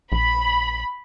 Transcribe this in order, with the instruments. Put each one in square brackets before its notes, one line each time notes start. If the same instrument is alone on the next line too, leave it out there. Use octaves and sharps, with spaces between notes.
[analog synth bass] A#1 [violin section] B5